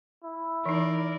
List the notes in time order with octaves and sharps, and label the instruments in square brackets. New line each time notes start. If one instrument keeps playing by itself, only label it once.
[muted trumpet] E4
[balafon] E3 D#4 [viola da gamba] A#4 D5